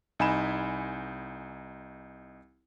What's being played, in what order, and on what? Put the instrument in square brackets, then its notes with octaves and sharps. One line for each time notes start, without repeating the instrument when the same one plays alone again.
[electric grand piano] C2 D#4 G#5 B5 E7